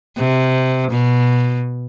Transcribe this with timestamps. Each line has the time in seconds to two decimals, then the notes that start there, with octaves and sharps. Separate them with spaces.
0.17 C3
0.91 B2